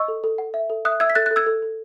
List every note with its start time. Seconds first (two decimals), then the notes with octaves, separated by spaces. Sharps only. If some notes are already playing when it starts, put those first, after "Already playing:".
Already playing: D#5 C#6 E6
0.08 A4
0.24 A4
0.38 F#5
0.54 E5
0.70 A4
0.85 E5 D#6 F#6
1.00 E5 E6 G#6
1.10 B6
1.15 A4 F#6 A6
1.26 F#6 A6
1.31 A4
1.36 E6 G#6
1.47 A4
1.62 A4